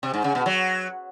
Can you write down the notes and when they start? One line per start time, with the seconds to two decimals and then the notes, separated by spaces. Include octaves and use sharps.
0.03 C3
0.14 G#2
0.24 C#3
0.35 B2
0.46 F#3